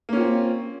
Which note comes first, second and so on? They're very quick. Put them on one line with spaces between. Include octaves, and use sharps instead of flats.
A#3 C#4 F4 C4